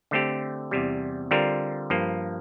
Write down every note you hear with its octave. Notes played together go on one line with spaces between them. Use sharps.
D3 A3 C4 G4
E2 C3 G3
D3 G3 C4 F4 A#4
G2 F3 A#3